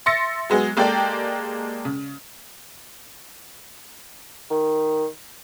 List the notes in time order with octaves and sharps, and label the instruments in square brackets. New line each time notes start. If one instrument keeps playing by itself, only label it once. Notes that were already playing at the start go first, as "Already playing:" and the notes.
[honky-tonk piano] E5 C6 E6 A6 A#6 C#7
F#3 G#3 B3 G#4
G#3 A#3 G4 A4 D5 G5
C#3
[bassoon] D#3